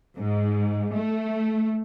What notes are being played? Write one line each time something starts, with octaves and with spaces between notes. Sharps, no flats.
G#2
A3